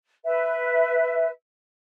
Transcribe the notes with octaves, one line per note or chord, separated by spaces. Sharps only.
B4 E5